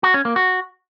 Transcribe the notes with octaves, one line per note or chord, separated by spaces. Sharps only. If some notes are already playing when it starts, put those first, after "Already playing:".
F#4
C#4
A#3
F#4